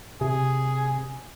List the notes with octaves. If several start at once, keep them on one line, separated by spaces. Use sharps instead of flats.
C3 G#4